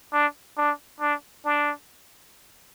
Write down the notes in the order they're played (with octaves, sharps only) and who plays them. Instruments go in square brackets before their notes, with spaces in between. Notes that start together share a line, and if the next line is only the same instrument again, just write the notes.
[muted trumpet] D4
D4
D4
D4